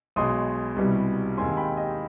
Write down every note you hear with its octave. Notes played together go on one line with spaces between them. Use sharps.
B1 B2 G#3 C6 D#6
C2 B2 G3 B3
D#2 D#3 G#3 C4 G#5 C6
G5 B5
D#5 G5